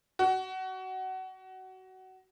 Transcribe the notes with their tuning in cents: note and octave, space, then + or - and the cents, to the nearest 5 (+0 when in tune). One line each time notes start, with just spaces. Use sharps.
F#4 +25